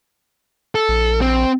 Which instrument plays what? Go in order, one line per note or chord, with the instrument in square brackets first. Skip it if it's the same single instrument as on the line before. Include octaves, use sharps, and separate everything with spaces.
[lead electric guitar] A4
[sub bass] A#1
[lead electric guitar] C4